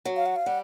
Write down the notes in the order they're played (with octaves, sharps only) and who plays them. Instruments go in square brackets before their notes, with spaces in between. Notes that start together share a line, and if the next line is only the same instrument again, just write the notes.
[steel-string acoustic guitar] F#3
[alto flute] F5
F#5
F5
[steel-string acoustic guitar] G3 [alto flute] F#5